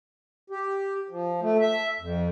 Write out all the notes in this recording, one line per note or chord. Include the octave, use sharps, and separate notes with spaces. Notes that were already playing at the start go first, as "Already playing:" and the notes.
G4
F3
A3
E5
F2